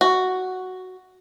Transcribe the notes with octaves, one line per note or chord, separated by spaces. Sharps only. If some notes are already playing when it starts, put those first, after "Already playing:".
F#4